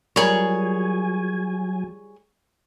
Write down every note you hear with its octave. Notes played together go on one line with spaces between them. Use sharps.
F#3 G3 F4 G#4 A#4 C#5 G#5